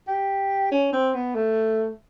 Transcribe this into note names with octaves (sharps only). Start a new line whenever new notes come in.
G4
C#4
C4
B3
A3